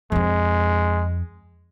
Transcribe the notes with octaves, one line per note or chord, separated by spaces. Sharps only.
F2 G#3 C4